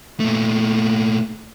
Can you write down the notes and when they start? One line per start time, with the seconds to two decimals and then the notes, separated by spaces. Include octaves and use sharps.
0.20 A#2 A3